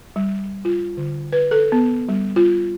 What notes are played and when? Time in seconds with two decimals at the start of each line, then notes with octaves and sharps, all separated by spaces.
0.16 G3
0.65 F4
0.97 D3
1.32 B4
1.51 A4
1.72 B3
2.09 G3
2.36 F4